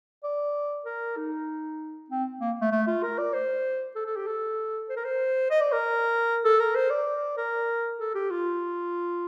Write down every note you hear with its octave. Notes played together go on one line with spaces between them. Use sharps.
D5
A#4
D#4
C4
A#3
A3
A3
F4
A#4
D5
C5
A4
A4
G4
A4
C5
A#4
C5
D#5
D5
A#4
A4
A#4
C5
D5
A#4
A4
G4
F4